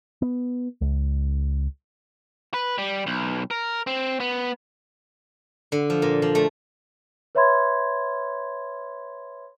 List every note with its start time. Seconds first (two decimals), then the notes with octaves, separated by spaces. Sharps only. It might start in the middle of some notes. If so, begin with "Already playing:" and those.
0.22 B3
0.81 C#2
2.54 B4
2.78 G3
3.07 B1
3.51 A#4
3.87 C4
4.20 B3
5.72 D3
5.90 F3
6.02 A#2
6.22 F3
6.35 A3
7.35 B4 C#5 E5 B5 C6 G#6